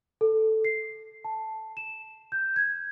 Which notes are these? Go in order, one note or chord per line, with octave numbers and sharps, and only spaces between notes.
A4
C7
A5
E7
G6
G#6